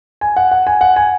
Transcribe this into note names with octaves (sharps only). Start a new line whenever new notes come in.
G#5
F#5
F#5
G#5
F#5
G#5